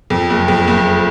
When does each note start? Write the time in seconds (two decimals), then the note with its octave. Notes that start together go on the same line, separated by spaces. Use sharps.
0.10 F2
0.30 F#1
0.48 F2
0.67 F#1